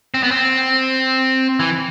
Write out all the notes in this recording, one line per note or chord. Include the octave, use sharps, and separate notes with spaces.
C4
B3
C4
E3